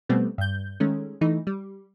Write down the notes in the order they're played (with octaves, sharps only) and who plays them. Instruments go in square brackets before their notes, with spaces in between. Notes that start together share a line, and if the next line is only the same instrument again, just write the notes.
[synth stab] B2 G3 A3 B3 C4
G2 G6
D#3 G#3 A3 C#4
E3 A3 D#4
G3